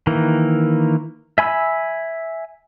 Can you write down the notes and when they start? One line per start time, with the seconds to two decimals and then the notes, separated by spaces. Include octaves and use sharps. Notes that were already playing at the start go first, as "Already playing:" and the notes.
0.07 D#3 E3 A#3
1.38 E5 G#5 B5 E6